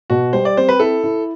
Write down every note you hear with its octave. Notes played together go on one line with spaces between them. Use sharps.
B2 F#4
G3 C5
D5
C4 C5
B4
E4 A4
E4